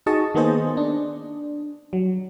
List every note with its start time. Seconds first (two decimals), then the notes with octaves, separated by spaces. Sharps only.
0.06 D#4 F#4 G#4 D#5 A5 C#6
0.35 D#3 A#3 B3 G#4 C5 D#5
0.77 D4
1.93 F#3